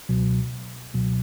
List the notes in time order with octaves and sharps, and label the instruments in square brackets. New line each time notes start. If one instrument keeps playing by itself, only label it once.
[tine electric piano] C#2 B2 F#3
C#2 B2 F#3